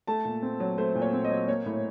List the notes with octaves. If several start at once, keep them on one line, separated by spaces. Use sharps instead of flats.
A3 A5
A#2
C4
F#3
A3 C5
A#2
C#5
C4
D#5
F#3
A#3 C#5
A2